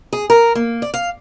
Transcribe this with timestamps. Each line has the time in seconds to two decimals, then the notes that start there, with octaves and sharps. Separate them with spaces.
0.13 G#4
0.30 A#4
0.55 A#3
0.82 D5
0.94 F5